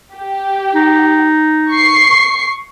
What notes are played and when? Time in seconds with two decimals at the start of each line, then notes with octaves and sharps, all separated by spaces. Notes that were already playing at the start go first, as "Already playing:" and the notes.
0.16 G4
0.75 D#4
1.71 C#6 C7